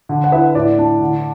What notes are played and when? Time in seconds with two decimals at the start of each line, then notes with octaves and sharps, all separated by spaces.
0.09 D3
0.24 F#5
0.32 E4 B4 E5
0.55 A2 D5
0.79 D4
1.01 D3